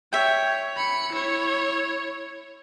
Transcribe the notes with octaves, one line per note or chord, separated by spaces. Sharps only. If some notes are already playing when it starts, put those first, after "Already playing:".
C#5 E5 G5
B5 C#7
E4 C#5